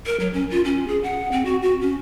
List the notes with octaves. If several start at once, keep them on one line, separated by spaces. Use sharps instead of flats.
A#4
F#3
C#4
F4
C#4
G#4
F#5
C4
F#4
F#4
C#4